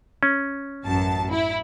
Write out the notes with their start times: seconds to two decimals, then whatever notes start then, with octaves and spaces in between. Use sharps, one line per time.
0.23 C#4
0.85 A1 F#2 A5
1.31 E4